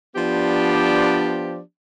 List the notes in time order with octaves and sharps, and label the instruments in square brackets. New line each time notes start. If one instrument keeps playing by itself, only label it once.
[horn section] F3 B3 D4 G4 C5 D5